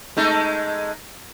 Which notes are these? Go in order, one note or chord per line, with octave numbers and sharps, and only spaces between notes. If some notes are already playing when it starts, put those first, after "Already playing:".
G#3 A3 D#4